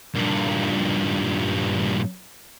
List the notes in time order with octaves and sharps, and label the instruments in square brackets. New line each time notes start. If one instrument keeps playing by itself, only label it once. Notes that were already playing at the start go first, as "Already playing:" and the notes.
[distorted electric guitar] G2 A#2